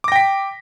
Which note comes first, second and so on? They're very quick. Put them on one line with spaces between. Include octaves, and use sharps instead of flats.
D6 A#6 G5 B6